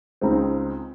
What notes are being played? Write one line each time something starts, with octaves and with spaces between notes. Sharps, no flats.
C#2 C#3 G#3 C4 D#4